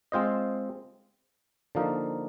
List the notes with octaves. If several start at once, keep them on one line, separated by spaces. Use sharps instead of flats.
G#3 C4 F4 C5 D#5
D3 F3 A#3 D#4 A#4